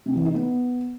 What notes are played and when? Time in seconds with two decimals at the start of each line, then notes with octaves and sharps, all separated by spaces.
0.06 C3
0.15 E3
0.25 D#4
0.35 B3